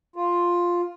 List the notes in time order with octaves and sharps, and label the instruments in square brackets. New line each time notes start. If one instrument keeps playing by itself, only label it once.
[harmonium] F4